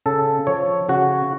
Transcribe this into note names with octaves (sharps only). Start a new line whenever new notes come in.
C#3 A4
F3 C#5
C#3 F#4